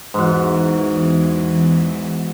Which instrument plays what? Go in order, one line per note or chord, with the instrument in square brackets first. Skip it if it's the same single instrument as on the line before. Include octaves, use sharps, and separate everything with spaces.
[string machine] E2 E3 [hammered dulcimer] G#2 F#4